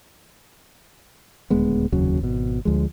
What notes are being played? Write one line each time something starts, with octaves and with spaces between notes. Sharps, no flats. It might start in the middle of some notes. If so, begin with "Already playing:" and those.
D#1 D2 G#3 B3
F1 D#2 C#3 F#3
G#1 B2
D2 F3 G#3